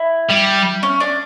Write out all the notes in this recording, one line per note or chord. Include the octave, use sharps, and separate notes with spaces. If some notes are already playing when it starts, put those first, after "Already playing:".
Already playing: E4
G3
C#4
D4